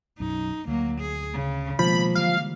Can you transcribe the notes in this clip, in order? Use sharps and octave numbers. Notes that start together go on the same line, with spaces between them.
B1 F#2 D#4
D2 F#3 A#3
G#4
C#3
B2 D#3 F3 G#3 A#3 B3 B5
D3 E3 G3 F5